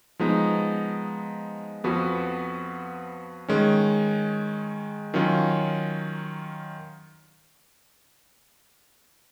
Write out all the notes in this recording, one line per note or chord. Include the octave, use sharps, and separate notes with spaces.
F3 G#3 B3 D#4
F2 F3 B3 F#4 B4
D#3 G#3 C#4
D#3 F#3 C#4 F4